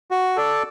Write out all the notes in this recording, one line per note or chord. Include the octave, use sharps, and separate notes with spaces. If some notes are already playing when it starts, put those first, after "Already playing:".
F#4
A4 D5